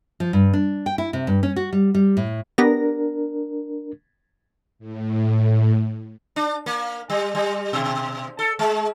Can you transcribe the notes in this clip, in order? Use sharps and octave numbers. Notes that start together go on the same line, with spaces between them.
F3
G2
D4
G5
E4
C3
G2
C#4
F#4
G3
G3
A2
B3 D4 G4 A#4 A#6
A2
D4
A#3
G3
G3
B2
A4
G#3